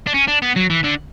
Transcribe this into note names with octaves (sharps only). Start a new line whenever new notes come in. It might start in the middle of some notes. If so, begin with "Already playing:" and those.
D4
C#4
D4
B3
F#3
E3
D3